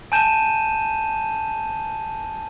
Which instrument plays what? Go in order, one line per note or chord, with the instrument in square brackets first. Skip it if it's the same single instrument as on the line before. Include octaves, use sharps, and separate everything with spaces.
[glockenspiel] G#5 A5 G6 D#7 E7